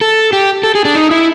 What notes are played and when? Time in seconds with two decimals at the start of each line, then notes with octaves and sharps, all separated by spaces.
0.01 A4
0.33 G4
0.63 A4
0.75 G#4
0.85 D4
0.95 D#4
1.11 E4